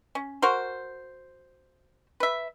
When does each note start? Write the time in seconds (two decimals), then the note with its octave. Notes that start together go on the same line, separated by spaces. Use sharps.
0.15 C#4
0.42 F#4 A#4 C5
2.20 B4 E5